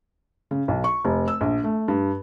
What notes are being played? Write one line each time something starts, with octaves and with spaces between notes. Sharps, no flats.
C#3
B1
C#6
F1
E6
A#1
A3
G2